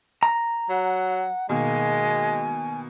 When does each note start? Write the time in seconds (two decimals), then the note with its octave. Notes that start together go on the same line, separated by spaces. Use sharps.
0.23 A#5
0.69 F#3 F#5
1.49 B2 D#3 G#3 A#3 G#5